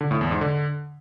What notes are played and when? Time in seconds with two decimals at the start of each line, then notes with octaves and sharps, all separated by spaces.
0.01 D3
0.11 A2
0.21 E2
0.31 G#2
0.41 D3